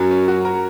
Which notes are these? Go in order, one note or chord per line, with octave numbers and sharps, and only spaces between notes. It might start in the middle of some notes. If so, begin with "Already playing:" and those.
Already playing: F#2 F#3 F#4 A#4
C#4
F#4
A#4